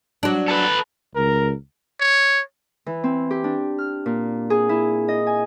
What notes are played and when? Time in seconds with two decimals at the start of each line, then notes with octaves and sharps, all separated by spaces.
0.23 F#3 D4
0.48 A4 B4
1.15 C#2 A#4
2.00 C#5
2.86 E3
3.04 C4
3.31 G4
3.44 D4
3.78 F6
4.06 A#2
4.50 G#4
4.69 E4
5.08 D#5
5.27 G#5